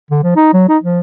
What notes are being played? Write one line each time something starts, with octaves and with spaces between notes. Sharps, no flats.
D3
F3
D#4
F#3
D#4
F3